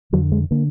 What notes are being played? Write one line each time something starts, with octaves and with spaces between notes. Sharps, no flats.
F2 D3 F#3
G#3
D3 A#3